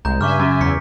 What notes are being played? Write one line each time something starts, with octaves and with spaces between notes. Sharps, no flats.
C2 G#3 A#5 G6
G2 C#3 E5 G#5 C#6 D6 F6
F#2
E2 B6 C#7